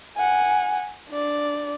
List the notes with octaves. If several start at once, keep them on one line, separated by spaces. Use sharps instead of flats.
F#5 G#5
D4 D5